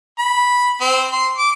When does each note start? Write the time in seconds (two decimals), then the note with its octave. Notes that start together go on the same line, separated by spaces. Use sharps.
0.19 B5
0.81 C4
1.12 C6
1.38 D6